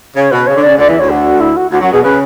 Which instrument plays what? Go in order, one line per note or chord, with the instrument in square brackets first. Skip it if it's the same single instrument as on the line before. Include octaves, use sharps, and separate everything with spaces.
[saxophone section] C#3 [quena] C#5
[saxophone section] B2 [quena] B4
[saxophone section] C#3 [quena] C#5
[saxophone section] D3
[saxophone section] C#3 [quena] D5
[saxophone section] D2 D3 [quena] D5
[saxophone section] E2 E3 [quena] E5
[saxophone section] D2 D3 [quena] C#5
[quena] F#4
E4
F#4
[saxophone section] D2 D3 [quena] F#4
[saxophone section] F#2 F#3 [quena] F#4
[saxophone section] B2 [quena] G#4
[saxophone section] C#3 [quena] B4